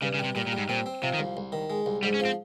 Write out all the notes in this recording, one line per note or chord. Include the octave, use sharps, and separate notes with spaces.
G2 C#3
C#3
G3
C3
A#2 G3
A#2
G3
G#2
A#2 C4
C4
C3 F3
D#3
C2
C2
D#3
G#3
C2
G#2 G3
C#4
F3
C4